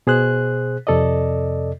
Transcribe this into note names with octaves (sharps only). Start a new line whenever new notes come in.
B2 G#4 C5 F#6
F2 C3 A4 D5 D#5